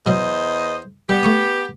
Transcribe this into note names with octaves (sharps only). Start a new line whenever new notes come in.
E2 B2 F#3 C5 D#5
G3 B3 G4
A3 C#6 D#6